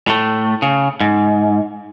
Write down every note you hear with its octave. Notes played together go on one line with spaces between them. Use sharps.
A2 A3
C#3
G#2